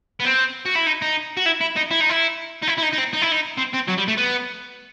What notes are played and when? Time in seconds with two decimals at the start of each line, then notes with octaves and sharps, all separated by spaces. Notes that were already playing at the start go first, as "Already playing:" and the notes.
0.20 B3
0.25 C4
0.65 F#4
0.75 E4
0.86 D#4
1.02 D#4
1.37 F#4
1.46 E4
1.61 E4
1.77 D#4
1.91 E4
2.01 D#4
2.10 E4
2.62 D#4
2.67 E4
2.77 E4
2.82 D#4
2.92 D#4
2.98 C4
3.13 D#4
3.22 E4
3.32 D#4
3.57 C4
3.73 C4
3.88 F#3
3.98 G3
4.08 A3
4.18 B3